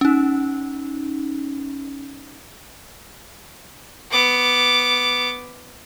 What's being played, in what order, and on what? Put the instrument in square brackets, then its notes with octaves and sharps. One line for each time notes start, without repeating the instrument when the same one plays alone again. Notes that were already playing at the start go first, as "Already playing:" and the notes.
[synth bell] C#4 D#4
[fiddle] B3 D6